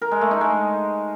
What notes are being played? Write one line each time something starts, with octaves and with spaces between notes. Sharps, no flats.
A#4
G#3
A3
D#4
G#3